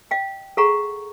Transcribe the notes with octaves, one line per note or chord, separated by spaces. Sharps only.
D#5 F5 G5
G#4 A4 F5 F#5 A#5 C#6